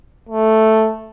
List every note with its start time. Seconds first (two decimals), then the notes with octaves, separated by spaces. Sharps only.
0.29 A3